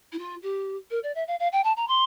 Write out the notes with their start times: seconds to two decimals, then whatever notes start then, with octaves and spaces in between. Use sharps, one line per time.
0.12 E4
0.18 F4
0.42 G4
0.91 A#4
1.03 D5
1.15 E5
1.27 F5
1.39 F5
1.52 G5
1.64 A5
1.77 A#5
1.88 C6